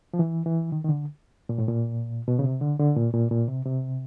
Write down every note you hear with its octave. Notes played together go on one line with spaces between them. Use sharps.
F3
E3
E3
D#3
D#3
D3
A#2
A2
A#2
B2
C#3
C3
D3
D3
A#2
A#2
A#2
C3
C3